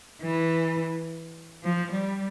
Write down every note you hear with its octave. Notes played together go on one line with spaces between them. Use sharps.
E3
F3
G3